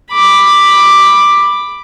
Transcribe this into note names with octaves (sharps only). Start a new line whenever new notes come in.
B5 D6